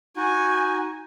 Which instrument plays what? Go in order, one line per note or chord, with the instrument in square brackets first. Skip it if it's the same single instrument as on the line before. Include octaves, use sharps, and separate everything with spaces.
[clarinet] D#4 [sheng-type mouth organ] F#4 [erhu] G#5